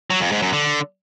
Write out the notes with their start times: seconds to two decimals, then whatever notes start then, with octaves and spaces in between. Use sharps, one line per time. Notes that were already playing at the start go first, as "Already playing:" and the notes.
0.10 F#3
0.21 F2
0.32 G#2
0.42 F#2
0.53 D3